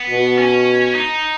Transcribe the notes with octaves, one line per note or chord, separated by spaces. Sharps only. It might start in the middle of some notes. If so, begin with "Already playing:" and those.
Already playing: B3
B2
C#4
D#4